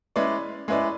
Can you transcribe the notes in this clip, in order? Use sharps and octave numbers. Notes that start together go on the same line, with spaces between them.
G#3 C#4 E4 B4 D5
G#3 C#4 E4 B4 D5